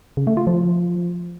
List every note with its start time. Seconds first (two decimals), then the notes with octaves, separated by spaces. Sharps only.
0.17 C#3
0.27 A3
0.37 F4
0.47 F3